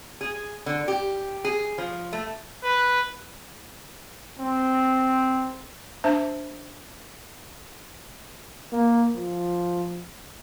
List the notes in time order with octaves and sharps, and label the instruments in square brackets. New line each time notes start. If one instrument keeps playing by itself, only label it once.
[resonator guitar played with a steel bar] G#4
D3
G4
G#4
F3
A3
[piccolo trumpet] B4
[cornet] C4
[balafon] D4 C5 E5 A5
[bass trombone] A#3
F3